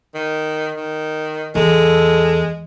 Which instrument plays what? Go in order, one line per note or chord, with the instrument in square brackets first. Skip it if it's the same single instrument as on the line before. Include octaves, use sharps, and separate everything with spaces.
[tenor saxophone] D#3
D#3
[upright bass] E2 [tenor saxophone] G#3 [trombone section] A4